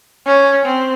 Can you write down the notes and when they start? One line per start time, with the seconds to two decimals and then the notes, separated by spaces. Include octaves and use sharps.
0.26 C#4
0.65 C4